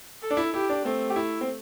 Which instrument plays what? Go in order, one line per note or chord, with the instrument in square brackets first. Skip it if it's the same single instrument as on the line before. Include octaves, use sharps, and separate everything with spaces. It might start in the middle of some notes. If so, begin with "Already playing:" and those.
[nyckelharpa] A4
[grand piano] D4
E4
[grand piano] E4 [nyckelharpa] G4
[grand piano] D4
[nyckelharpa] A3 [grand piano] C4
[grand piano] G4
E4
C4